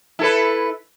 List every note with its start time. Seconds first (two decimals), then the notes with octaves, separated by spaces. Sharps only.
0.19 E4 A4 B4